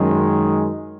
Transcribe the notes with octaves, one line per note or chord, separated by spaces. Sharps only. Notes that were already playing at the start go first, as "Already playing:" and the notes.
Already playing: F#2 D#3 G#3